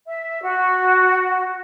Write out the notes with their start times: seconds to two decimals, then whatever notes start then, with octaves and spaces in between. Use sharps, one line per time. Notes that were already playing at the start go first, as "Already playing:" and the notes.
0.06 E5
0.42 F#4